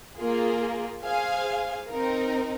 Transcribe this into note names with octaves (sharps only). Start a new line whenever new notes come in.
A#3 F4 G#4
G#4 C5 F5 G#5
C4 D#4 A#4